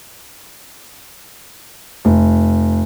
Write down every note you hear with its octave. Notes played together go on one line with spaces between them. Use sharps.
F1